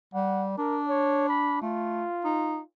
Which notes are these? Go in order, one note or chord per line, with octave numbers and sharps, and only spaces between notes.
G3 F#5
D4 A#4
C#5
B5
A3 F4
D#4